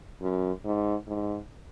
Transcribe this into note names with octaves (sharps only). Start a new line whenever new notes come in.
F#2
G#2
G#2